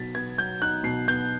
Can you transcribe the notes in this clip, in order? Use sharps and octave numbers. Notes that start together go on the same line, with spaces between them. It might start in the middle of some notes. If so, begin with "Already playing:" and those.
Already playing: B2 F#3 D#4 A6 B6
B3 G#6
F#3 G6
D#4 F#6
B2 C7
B3 G6